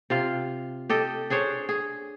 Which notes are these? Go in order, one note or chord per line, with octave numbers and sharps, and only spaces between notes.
C3 F4 F5
G4 A4 D#5
D4 G#4 C5 C#5
G#4